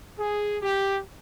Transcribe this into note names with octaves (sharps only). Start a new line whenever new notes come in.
G#4
G4